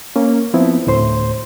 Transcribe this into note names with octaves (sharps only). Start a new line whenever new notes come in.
A#3 C#4
F3 B3 C4 E4
D2 A2 C5 C6